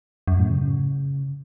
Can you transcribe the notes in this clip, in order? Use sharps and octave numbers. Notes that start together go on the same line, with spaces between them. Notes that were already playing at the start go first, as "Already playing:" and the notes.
F#2
A2
C#3